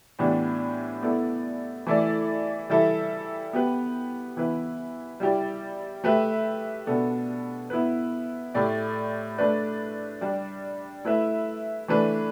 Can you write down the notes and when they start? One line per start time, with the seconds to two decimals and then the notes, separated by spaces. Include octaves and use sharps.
0.19 A2 E3 B3 D4 G4
1.03 B3 E4 A4 D5
1.86 E3 A3 E4 A4 D5
2.70 E3 G3 E4 A4 E5
3.53 B3 G4 B4
4.37 E3 B3 E4 B4
5.20 G3 E4 G4 D5
6.04 A3 G4 B4 E5
6.87 B2 B3 D4 A4
7.70 B3 E4 B4
8.54 A2 A3 G4 D5
9.38 A3 D4 B4 D5
10.21 G3 D4 G4 D5
11.05 A3 E4 B4 E5
11.88 E3 A3 D4 B4